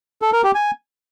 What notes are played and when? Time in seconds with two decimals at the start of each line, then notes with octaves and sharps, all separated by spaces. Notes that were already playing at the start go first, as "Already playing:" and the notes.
0.22 A4
0.33 A#4
0.44 G4
0.55 G#5